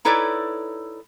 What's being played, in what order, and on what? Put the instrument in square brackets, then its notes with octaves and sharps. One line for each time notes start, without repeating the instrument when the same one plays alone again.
[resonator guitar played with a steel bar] D#4 E4 A4 B4 C#5 D5